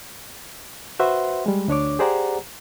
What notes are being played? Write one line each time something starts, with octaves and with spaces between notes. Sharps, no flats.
F#4 B4 C5 E5 F#5 C6
G3 G#3
D2 D4 C#5 D6
G4 G#4 C5 D5 F#5 A#5